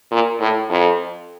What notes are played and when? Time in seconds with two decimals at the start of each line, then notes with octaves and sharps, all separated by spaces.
0.12 A#2
0.41 A2
0.70 F2